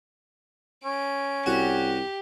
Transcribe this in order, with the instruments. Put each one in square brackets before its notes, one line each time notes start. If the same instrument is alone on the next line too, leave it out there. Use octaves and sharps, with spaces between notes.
[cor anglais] C#4 [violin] D7
[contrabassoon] C2 [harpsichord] F#4 [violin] G4